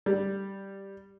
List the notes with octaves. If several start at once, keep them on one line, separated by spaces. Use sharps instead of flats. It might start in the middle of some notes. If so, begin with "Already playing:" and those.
G3